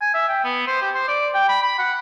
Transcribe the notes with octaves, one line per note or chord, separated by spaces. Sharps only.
G#5
E5
G5
B3
C5
G4
C5
D5
G5
B5
B5
F#5